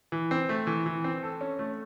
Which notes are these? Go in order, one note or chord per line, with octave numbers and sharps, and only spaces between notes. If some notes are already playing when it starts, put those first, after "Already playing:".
E3
C4
A3
E3
E3
C4
A4
C#4
A3